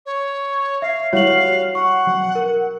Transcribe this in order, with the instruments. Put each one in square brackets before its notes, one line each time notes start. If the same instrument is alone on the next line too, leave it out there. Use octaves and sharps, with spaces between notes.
[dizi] C#5
[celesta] E5 [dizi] F5
[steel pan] G3 E4 F#4 [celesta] C#5 F#7 [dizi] F5
[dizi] F#5 [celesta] C#6
[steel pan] F#3
[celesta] A#4